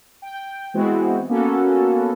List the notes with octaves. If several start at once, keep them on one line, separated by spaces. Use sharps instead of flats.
G5
E3 G#3 B3 C4 E4 F#4
A#3 B3 C#4 F#4 A4